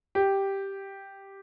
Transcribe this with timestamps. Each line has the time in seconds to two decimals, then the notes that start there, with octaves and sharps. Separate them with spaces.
0.15 G4